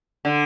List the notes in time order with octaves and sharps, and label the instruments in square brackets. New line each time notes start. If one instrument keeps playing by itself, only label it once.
[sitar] D3